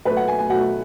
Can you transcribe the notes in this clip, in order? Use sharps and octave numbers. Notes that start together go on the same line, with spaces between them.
B2 F#3 A3 B4
F#5
G#5
G#5
B2 F#3 A3 F#5